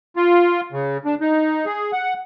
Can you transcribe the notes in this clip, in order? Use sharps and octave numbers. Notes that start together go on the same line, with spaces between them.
F4
C#3
D4
D#4
G#4
F#5